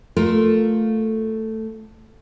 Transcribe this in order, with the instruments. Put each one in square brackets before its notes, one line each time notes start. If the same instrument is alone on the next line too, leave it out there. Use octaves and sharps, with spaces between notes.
[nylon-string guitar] A3 F4 A4 A#4